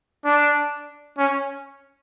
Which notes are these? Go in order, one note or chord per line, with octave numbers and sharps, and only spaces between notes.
D4
C#4